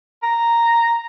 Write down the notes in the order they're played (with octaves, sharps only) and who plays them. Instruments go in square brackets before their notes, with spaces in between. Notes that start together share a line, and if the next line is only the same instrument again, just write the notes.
[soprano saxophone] A#5